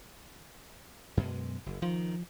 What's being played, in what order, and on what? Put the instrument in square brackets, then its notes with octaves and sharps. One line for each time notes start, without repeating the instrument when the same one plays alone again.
[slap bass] F#2 B2 G#3
F#1
[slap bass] D#3 [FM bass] F3